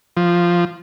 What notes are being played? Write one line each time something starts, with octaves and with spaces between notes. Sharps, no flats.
F3